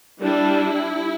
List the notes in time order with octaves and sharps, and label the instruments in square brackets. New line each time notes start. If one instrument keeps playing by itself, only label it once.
[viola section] G3 D4 E4